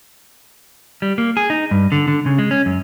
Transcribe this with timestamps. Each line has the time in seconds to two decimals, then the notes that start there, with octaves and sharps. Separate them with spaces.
1.02 G3
1.18 A#3
1.37 G#4
1.50 D#4
1.71 G2
1.92 D3
2.08 D3
2.26 C#3
2.38 G#3
2.51 C#4
2.66 F#2